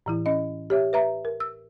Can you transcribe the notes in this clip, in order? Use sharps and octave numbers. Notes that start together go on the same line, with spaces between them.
A2 E3 E4
C#4 D#5
G4 C#5 E5
B4 E5 A#5
A#4
E6